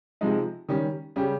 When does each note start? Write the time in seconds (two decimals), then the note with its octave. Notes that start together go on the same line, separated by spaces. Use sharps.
0.21 C3 F3 G#3 D#4
0.69 D#3 G3 C#4
1.16 C#3 G3 C#4 G4